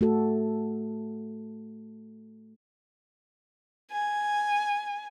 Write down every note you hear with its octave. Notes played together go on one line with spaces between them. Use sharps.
A3 F#4 A4
G#5